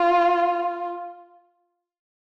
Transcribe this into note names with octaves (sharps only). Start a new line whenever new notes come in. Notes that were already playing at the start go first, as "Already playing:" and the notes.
Already playing: F4